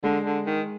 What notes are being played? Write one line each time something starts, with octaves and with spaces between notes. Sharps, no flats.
D3 G#3
D3
D#3